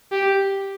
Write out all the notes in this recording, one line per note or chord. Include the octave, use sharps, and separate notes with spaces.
G4